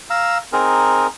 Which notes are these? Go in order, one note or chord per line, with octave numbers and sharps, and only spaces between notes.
F5 A#5 E6
C4 D#4 G#4 A#4